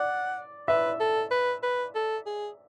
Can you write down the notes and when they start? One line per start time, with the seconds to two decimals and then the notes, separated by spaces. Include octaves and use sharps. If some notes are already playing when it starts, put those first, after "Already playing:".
Already playing: D5 F#5
0.68 B4 E5
1.00 A4
1.31 B4
1.63 B4
1.95 A4
2.26 G#4